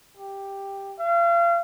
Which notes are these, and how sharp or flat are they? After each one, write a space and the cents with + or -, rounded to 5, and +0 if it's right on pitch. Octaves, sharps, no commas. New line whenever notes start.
G4 +5
F5 -35